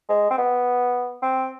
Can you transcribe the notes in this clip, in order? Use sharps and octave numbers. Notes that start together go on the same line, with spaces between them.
G#3
C4
B3
C4